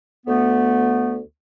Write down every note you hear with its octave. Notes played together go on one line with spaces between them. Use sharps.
D2 A3 B3